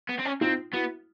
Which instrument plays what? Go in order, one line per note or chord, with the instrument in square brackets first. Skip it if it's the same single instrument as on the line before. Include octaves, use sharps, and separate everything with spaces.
[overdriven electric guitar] B3
C4
C#4
[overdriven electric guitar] C4 [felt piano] D#4 F4
[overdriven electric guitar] B3 [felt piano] E4 F#4